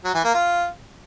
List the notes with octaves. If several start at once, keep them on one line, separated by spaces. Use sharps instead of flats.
F#3
E3
A#3
F4